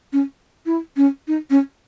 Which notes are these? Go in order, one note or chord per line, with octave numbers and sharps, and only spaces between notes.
C#4
E4
C#4
D#4
C#4